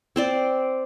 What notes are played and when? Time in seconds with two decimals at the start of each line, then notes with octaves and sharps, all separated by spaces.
0.16 C4 C5 D5